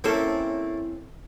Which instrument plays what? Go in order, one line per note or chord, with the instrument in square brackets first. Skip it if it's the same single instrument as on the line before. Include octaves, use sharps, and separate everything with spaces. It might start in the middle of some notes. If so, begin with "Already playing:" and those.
[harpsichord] A3 A#3 [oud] C4 C#4 A4 [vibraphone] E4